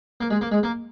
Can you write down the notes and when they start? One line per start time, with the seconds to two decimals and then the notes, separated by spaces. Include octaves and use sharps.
0.21 A#3
0.30 G#3
0.41 A#3
0.52 G#3
0.63 A#3